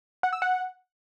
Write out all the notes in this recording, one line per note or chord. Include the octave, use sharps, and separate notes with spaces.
F#5
E6
F#5